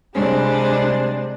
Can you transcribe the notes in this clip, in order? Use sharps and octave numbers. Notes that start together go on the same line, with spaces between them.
C3 G3 G#3 D4 G#4 C5